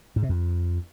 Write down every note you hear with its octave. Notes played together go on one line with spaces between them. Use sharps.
G#2
C3
F2